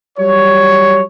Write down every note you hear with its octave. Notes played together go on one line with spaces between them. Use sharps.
F#3 G3 C#5